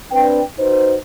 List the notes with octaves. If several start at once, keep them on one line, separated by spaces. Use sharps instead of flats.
C4 D4 B4 G5
D#4 F#4 B4 C5